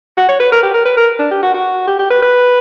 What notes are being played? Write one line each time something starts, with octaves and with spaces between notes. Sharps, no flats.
F#4
C#5
B4
A#4
G4
A#4
B4
A#4
D4
G4
F#4
F#4
G4
G4
B4
B4